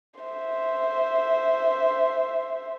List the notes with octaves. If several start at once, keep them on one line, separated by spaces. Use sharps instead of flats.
C5 E5